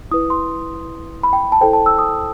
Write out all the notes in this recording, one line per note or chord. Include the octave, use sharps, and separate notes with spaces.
E4 B4 D#6
C6
B5
G5
A5
E4 A4 C5 G5
A5
E6
D#6